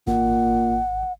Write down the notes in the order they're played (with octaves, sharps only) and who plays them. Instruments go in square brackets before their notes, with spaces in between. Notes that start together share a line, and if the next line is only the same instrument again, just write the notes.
[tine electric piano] G#1 [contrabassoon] A#2 [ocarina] F#5